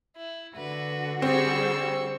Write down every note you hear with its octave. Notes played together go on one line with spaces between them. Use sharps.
E4
D3 F#4 B4
G3 C4 G#4 C5 C#6 E6